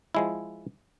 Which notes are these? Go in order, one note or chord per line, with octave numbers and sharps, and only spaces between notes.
F3 G#3 E4